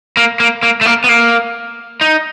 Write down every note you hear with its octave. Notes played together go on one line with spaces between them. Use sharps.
A#3
A#3
A#3
A3
A#3
B3
A#3
D#4